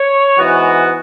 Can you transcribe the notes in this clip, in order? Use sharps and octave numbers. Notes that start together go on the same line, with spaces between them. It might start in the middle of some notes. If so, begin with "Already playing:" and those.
Already playing: C#5
G#2 E3 B3 F#4